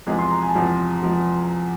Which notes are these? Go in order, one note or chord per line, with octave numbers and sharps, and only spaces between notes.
E2 C3 F3 G#3
C6
A#5
G#5
A5
E2 C3 F3 G#3 G#5
F3 G#3